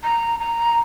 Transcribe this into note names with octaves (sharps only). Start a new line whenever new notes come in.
A#5
A#5